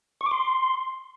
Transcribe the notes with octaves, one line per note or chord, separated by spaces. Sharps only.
C#6
D6
C6